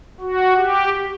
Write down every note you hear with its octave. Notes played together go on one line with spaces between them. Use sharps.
F#4
G4